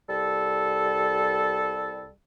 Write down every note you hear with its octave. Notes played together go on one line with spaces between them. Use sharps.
C2 G3 A4